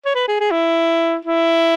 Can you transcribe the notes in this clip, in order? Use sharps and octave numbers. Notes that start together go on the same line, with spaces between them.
C#5
B4
G#4
G#4
E4
E4